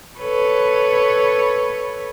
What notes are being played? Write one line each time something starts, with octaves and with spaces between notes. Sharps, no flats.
A4 B4 C#5